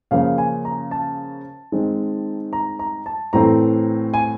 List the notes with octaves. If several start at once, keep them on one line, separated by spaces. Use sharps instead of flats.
C#3 F3 A#3 C#4 F5
G#5
A#5
A5
D#3 G#3 C4
A#5
A#5
A5
A2 E3 A3 C4 A#5
G#5